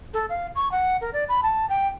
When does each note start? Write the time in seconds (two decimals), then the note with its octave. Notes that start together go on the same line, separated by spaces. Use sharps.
0.14 A4
0.29 F5
0.55 C#6
0.71 F#5
1.01 A#4
1.13 D5
1.29 B5
1.43 A5
1.69 G5